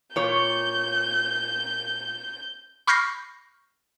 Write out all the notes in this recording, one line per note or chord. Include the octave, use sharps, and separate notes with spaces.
A#2 C#5 G6
B5 C#6 F6 G6 A#6 C7